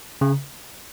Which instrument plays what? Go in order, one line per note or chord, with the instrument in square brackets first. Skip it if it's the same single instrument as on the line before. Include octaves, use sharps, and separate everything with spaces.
[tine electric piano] C#3